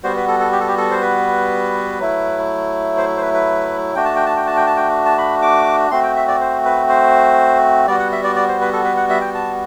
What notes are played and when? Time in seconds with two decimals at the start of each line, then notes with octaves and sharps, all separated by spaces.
0.03 G3 B3 F#4 C5
0.17 B4
0.28 A4
0.40 A4
0.52 G4
0.60 A4
0.68 G4
0.78 A4
0.91 C5
1.02 B4
2.00 F#3 A3 E4
2.97 C5
3.17 C5
3.21 B4
3.34 B4
3.95 A3 D4 F#4 G5
4.05 A5
4.16 G5
4.26 A5
4.37 G5
4.47 A5
4.56 G5
4.67 A5
4.77 G5
5.06 A5
5.18 B5
5.42 D6
5.91 A3 C4 F#4 C6
6.03 G5
6.16 E5
6.28 D5
6.40 C5
6.65 B4
6.89 C5
7.87 G3 B3 F#4 D5
7.99 F#5
8.12 E5
8.24 D5
8.36 D5
8.48 C5
8.61 B4
8.73 A4
8.84 B4
8.97 F#5
9.10 E5
9.21 G5
9.35 A5